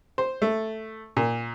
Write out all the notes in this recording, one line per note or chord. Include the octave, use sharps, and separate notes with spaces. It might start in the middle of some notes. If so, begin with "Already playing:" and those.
C5
A3
A#2